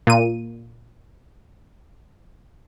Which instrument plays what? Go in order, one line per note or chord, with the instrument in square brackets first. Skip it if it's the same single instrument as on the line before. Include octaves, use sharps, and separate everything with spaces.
[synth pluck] A#2 D#7